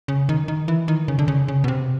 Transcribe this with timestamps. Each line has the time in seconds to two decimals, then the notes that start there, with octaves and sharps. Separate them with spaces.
0.08 C#3
0.29 D#3
0.48 D#3
0.68 E3
0.88 D#3
1.08 C#3
1.19 D3
1.28 C#3
1.48 C#3
1.64 B2
1.68 C3